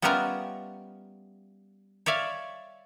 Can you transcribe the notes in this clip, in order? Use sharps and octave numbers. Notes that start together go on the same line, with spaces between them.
G3 B3 C#4 F4 A#4 E5
C#5 D5 E5 F5